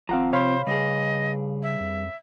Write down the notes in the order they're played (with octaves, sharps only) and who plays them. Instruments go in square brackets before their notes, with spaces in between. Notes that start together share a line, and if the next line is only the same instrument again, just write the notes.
[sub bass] G#1 [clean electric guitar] F3 C4 [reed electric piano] F5 F#5 A#5
[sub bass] C3 [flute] C5 [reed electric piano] C#5 F5 B5
[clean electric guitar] G2 G#4 [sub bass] C#3 [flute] D#5
[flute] E5
[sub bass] F2